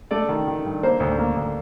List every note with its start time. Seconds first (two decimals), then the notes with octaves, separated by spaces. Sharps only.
0.11 A3 D5
0.29 D#3
0.47 D#3
0.64 G2
0.83 A#3 C5
1.00 D2
1.18 A#3
1.36 D2